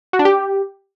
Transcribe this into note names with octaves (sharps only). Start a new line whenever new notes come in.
F#4
D4
G4